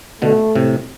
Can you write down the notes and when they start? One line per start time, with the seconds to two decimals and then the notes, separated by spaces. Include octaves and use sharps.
0.21 B2 D3 A3
0.55 A2 C3